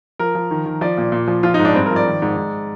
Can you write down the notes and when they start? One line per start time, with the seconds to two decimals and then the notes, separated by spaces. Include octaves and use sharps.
0.19 F3 A#4
0.35 F3
0.51 D#3
0.66 D#3
0.81 F3 D5
0.97 A#2
1.12 A#2
1.28 F3
1.43 F3 F4
1.54 D#4
1.59 G#2
1.65 D4
1.74 G2 C4
1.86 A#4
1.91 F3
1.96 D5
2.06 D#3
2.22 G#2
2.37 G#2